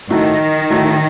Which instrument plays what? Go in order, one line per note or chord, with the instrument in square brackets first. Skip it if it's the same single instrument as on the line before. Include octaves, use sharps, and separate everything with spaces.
[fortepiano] A2 A3 D#4 F#4 [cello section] D#3
[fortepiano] A2 A3 D#4 F#4